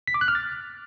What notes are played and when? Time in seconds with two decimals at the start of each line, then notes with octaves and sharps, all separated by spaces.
0.07 B6
0.14 D6
0.21 F#6
0.28 F6
0.35 A6